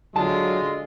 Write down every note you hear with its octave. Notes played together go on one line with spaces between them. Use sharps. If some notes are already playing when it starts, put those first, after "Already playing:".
D3 F#3 G#3 F4 A5